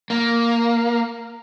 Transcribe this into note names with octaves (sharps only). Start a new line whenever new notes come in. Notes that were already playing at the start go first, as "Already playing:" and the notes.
A#3